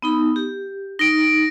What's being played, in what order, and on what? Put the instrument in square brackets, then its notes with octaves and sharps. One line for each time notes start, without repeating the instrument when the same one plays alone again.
[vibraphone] B3 D#4 B5
G4
[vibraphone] D#4 [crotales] A#6 D7